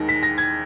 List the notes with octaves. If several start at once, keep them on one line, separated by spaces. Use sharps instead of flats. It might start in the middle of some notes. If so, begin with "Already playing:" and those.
Already playing: D#2 D#3 G#3 A#6
B6
A#6
G#6